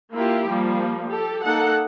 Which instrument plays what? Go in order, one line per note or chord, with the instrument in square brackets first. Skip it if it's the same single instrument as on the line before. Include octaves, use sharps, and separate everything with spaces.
[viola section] A#3 E4 F4 G4
F3 G3 A#3
G4 A4
A#3 D#4 A4 F#5